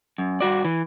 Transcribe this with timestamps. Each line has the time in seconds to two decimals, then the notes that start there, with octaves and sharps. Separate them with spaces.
0.18 F#2
0.41 G2 F#4 D5
0.65 E3